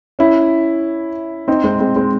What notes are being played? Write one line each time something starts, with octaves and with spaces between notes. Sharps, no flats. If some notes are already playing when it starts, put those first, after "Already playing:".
C#4 E4
C4 D#4
G#3 C4
G#3 C4
G#3 C4